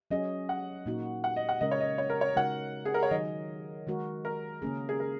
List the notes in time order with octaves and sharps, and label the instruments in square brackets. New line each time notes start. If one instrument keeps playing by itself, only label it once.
[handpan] F#3 C#4 G#4 [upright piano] D#5
[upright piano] F#5
[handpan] A#2 A#3 D#4 F#4
[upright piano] F#5
D#5
F#5
[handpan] C#3 G#3 C#4 A#4 [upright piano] D#5
[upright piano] C#5
D#5
C#5
A#4
C#5
[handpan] C#3 G#3 D#4 F#4 A#4 [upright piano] F#5
[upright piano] G#4
A#4
C#5
[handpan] D#3 F#3 D#4 G#4 [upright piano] D#5
[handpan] D#3 G#3 F#4 A#4
[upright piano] A#4
[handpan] C#3 A#3 C#4 G#4
[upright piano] G#4
A#4